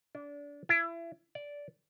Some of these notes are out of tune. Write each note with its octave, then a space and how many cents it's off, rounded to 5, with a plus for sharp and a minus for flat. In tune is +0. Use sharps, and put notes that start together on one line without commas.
D4 -25
E4 +30
D5 -15